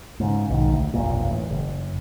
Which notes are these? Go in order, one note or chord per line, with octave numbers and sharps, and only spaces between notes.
G#2 C#3
B1 G#2 D#3
D2
F1 B1 G2 A#2
A1
F#1